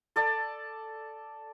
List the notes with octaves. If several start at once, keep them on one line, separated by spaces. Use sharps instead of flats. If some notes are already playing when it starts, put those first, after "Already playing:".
A4 D5 A5